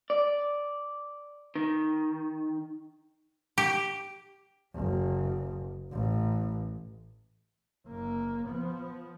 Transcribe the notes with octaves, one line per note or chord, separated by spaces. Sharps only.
D5
D#3
G4
F#1
A1
F#1 A#3
F3 B3